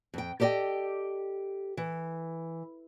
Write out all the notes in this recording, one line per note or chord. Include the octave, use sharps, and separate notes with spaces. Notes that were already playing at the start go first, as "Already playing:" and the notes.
F2 G5
G4 A4 D5 D#5 G5
E3